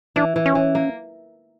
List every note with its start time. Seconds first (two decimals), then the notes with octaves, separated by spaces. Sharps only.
0.16 E3 D4
0.36 E3
0.46 C#4
0.55 E3
0.75 A#3